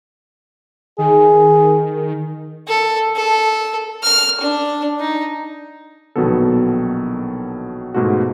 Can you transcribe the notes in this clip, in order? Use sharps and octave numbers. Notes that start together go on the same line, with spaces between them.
D#3 G#4
A4
A4
F6
D4
D#4
A#1 B2 D#3 F#3 B3 A4
G#2 B2 A3 F4 F#4